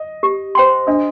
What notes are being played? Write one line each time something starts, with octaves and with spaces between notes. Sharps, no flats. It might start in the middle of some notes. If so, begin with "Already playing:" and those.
Already playing: D#5
G4
C5 G5 C6
D4 D#5